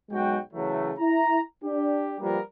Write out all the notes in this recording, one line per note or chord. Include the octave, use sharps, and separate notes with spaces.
B1 G#3 F#4 G5
C#3 E3 F#3 A3
E4 A#5
D4 G4
F3 G3 A#3 B3 A#4